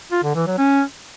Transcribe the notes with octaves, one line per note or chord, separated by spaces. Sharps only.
F4
D3
E3
F#3
C#4